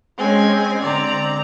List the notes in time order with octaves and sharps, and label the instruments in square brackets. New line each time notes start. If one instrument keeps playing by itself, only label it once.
[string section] G#3 C#4 [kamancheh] C4 G#5
[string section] D3 G#3 C4 [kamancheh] D5 A#5